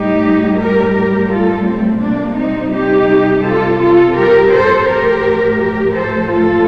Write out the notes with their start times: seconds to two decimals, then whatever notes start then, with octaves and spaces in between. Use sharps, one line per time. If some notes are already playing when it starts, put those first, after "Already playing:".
Already playing: A2 G3 D#4 G4
0.60 G4 A#4
0.95 G4 A#4
1.31 F4 A4
1.66 A3 C4
2.02 C3 G3 A#3 D4
2.38 C4 D#4
2.73 D#4 G4
3.45 F4 A4
3.80 F4 A4
4.16 G4 A#4
4.52 A4 C5
4.88 A2 F3 A3 G4 A#4
5.59 G4 A#4
5.95 A4 C5
6.30 F4 A4